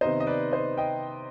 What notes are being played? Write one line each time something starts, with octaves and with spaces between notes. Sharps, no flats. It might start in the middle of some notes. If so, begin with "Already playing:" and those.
C3 D#3 B3 D#4 C5 D#5
D#5
B4 D5
C5 D#5
D#5 G5